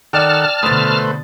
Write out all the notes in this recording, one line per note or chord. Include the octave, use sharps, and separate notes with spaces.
D#3 A4 D5 F#5 G5 A5 F6
B2 D3 A3 B4 C5 D#6 A6